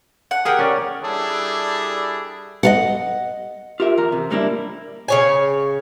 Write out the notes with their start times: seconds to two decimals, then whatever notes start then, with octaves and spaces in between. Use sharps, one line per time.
0.31 F#5
0.45 G4 G#4 A#4 F#5 G5
0.59 C#4 D5
1.02 G3 D4 E4 G#4 A4
2.63 D#5 F5 F#5
3.80 F4 G4 A#4 E5
3.98 E2 A#4 A#5
4.12 C3
4.30 G#2 G3 A#3 D4 E4
5.08 C#3 C#5 G#5